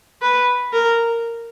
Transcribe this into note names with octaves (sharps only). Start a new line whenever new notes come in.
B4
A#4